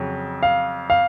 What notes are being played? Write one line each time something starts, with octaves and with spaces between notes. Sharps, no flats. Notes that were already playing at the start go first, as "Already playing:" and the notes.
Already playing: F2 C#3 F#3
F5
F5